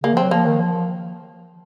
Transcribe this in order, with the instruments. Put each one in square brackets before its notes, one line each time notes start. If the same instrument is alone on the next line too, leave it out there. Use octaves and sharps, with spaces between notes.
[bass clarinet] C#3 [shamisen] A#3
[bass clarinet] F3 [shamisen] C4
[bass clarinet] F#3
[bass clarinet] F3 [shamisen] A#3
[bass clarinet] D#3
F3